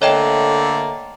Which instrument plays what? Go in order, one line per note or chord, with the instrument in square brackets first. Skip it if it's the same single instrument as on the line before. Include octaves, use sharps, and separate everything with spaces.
[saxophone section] D3 A3 A#3 [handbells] C#5 D#5 G5